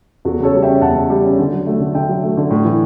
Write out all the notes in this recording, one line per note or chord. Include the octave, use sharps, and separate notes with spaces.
E2 F#4 A4
C#3 A4 C#5
G3
C#4 E5 G5
E2 F#5 A5
C#3
G3
C#4
D3
F#3
A3
D3
D3 E5 G5
F#3
A3
D3
A2
E3